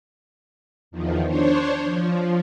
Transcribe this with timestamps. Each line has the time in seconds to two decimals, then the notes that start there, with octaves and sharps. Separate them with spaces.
0.91 E2 D#3 F3
1.27 D4 C5 C#5
1.84 F3